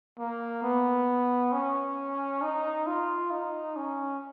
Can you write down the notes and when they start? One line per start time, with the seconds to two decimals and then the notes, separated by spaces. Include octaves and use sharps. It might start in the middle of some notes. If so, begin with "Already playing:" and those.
0.18 A#3
0.63 B3
1.53 C#4
2.42 D#4
2.87 F4
3.31 D#4
3.76 C#4